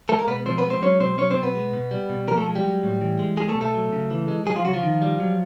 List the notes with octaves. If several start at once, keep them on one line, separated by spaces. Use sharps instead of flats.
G#3 A3 A4
A#3 A#4
B2 B3 B4
F3 C4 C5
B3 B4
G#3
C4 C5
F#3 C#4 C#5
B2 C4 C5
F#3 C#4 C#5
C4 C5
B2
B3 B4
G#3
B2
G3
B2
F3 A#3 A#4
A3 A4
G#3
G3 G4
F#3
A2
E3
G#3
G3 G#3 G#4
A3 A4
B2
A3 A4
F#3
C#3
E3
G#3
F#3 G#3 G#4
F3 F4
C#3 F#3 F#4
F3 F4
D#3
G3
F#3